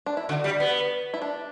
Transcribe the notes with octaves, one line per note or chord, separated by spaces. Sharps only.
D4
E4
D3 F#4
G3
B3
E4
D4